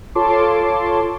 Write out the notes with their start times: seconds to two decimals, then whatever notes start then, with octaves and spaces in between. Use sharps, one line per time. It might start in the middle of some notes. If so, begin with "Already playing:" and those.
0.15 F4 A4 C#5 A5 C6 D6